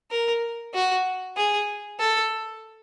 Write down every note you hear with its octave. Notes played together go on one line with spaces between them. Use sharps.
A#4
F#4
G#4
A4